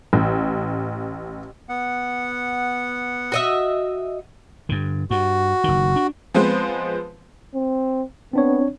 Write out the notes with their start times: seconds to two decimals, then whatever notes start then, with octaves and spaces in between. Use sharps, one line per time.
0.13 A1
1.69 B3 F#5
3.32 F#4 D#5 E5
4.69 G2 D3
5.11 G2 F#4
5.64 F#1 D#3
5.96 D4
6.34 F3 G#3 B3 C4 B4 C5
7.55 C4
8.33 B3 C4 D4 C#5